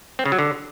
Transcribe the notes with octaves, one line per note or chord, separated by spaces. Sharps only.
C4
C#3
F#3
D3